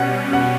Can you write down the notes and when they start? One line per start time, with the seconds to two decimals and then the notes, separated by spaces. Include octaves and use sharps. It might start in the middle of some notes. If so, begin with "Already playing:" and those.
Already playing: B2 G3 C#4 F#5
0.33 F#5